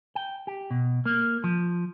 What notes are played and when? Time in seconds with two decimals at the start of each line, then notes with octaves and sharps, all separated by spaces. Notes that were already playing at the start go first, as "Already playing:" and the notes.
0.15 G5
0.47 G4
0.71 B2
1.06 A#3
1.44 F3